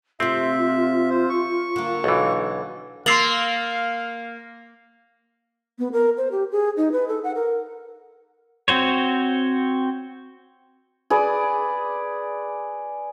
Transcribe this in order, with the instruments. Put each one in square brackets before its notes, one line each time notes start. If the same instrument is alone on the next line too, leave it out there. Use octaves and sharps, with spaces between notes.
[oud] C3 A3 [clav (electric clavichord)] C4 [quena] F4 [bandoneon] E5
[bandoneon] C5
C#6
[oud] D3 A#3
[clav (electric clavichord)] B1 E3
[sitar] A#3 [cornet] F5 [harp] C6 E6 A6 [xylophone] C7 F7 F#7
[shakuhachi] B3
A#4
C5
G4
G#4
D#4
B4
A4
F#5
A#4
[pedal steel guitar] C4 F#4 C5 C#5
[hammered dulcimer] G#4 B4 D5